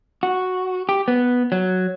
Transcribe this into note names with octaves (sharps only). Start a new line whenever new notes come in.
F#4
G4
B3
F#3